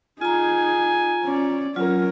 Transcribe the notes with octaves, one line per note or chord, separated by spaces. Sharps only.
D#4 F4 G#4 G#5 A#5
C#4 D5
F#3 C#4 F4 A#4